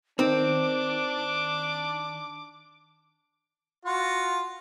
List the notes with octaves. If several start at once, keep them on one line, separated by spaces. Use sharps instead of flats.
D#3 C4 D4 D6
F4 F#4